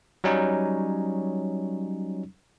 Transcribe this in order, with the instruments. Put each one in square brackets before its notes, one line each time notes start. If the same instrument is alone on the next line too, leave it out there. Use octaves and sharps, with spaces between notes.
[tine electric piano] F#3 G3 C#4 D#4